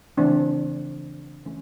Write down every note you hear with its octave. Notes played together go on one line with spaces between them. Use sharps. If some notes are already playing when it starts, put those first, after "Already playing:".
C#3 E3 A3 C4 D4
E3 A3 C#4